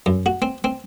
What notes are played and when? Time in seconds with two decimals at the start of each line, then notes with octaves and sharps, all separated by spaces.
0.06 F#2
0.26 F#4
0.42 C4
0.64 C4